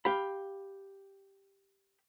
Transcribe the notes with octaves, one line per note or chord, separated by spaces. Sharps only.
G4 F5 B5